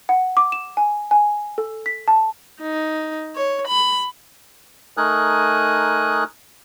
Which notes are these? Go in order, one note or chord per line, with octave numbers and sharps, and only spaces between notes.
F#5
D6
E7
G#5
G#5
A4
B6
A5
D#4
C#5
B5
A3 D#4 A#4 G#5 D#6 F#6